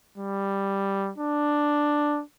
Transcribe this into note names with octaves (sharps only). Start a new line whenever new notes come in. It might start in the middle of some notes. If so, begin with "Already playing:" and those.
G3
D4